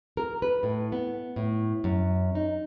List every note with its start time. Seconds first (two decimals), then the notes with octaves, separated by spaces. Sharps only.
0.17 A#4
0.42 B4
0.63 A2
0.92 B3
1.36 A2
1.84 F#2
2.35 D#4